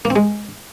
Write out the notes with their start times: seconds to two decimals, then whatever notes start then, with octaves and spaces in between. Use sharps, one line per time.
0.05 A#3
0.10 C4
0.16 G#3